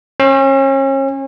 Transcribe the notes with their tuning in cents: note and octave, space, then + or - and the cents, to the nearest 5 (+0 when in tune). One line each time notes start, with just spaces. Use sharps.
C#4 -35